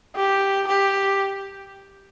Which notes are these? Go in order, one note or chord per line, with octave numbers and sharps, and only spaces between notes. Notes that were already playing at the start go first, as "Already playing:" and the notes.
G4
G4